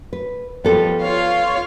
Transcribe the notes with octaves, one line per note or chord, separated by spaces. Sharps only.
B4
F3 G3 B3 A4
F4 C#5 F5